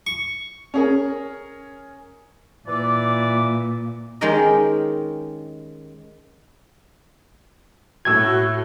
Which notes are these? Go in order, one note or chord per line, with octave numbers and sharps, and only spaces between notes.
C#6
C#4 G#4 A#4
A#2 E3 D5 D6
D#3 G#3 C#4 G4 A#4 D#5
A2 F#4 A5 C#6 E6 G#6